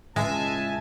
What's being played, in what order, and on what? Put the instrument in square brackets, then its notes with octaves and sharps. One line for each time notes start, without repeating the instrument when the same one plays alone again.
[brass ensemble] C#2 A5 [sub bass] A2 [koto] G#3 [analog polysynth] E5 G#5